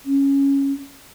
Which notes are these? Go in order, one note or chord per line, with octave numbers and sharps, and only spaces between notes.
C#4